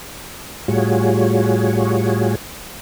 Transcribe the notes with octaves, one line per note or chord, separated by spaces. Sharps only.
A2 G3 F4 F#4 G#4 C#5